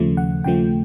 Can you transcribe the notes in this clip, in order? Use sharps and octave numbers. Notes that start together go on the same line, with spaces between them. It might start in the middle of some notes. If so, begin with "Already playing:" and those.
Already playing: D#2 C#3 F3 A3
F#5
D#2 C#3 F3 A3 G5